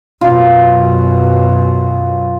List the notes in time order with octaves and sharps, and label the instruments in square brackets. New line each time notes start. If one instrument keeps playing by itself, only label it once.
[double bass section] F#2 B2 [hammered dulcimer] F4